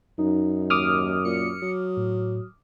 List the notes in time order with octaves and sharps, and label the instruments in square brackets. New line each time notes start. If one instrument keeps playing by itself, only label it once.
[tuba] F#2 [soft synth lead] D#4
[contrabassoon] D#2 [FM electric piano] D6 D#6 F6
[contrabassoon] A#2 [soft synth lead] C#7
[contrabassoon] F#3
[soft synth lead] A2